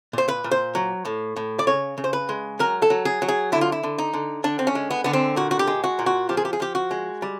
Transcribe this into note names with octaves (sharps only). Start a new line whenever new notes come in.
A#2 C5
B4
A#2
C5
F#3
A2
A2
D5
C#3 C#5
C#3
C5
B4
G#3
F#3 A#4
A4
F#3
G#4
F#3
G#4
D3 E4
F4
E4
D3
D#4
D3
D3 D4
C4
C#4
G#3
B3
D3 B3
C4
A#2 F#4
F#4
G4
G#3
F#4
A#2
F#4
F3 G4
G#4
G4
G#4
F3 G4
F#4
G#3
G3